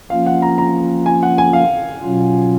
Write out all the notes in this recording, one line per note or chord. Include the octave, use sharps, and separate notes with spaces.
F3 A#3 C#4 F4 F5
F#5
A#5
A#5
G#5
F#5
G#5
F5
B2 F#3 C#4 F4